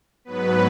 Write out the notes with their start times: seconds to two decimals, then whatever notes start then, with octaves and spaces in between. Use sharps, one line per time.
0.25 G#2 F#3 B3 B4